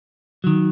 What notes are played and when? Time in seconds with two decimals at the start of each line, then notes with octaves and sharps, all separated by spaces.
0.44 D#3 F#3